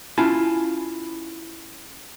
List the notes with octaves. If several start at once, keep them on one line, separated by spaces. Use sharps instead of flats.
C#4 E4 F4 G#5 A5